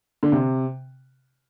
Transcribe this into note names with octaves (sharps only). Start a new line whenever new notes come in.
D3
C3